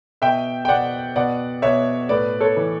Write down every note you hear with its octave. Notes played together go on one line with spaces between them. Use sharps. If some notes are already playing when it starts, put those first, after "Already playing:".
B2 E5 G5
G5
B2 D5 F#5
B2 D5 F#5
B2 C#5 E5
A2 B4 D5
A4 C#5
E3